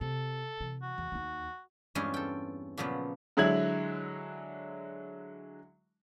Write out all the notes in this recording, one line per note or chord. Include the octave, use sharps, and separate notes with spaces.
C3 A4
C3 E3
F#4
E2
D#2 D#4
E2 G2 G#3 C4 C#4 F4
A4 G5
A#2 C#3 F3 F#3 B3
D3 F#3 G#3 E4 G#6 F#7